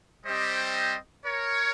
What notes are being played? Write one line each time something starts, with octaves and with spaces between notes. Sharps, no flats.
G3 C4 G4 C5 D#5
A#4 C#5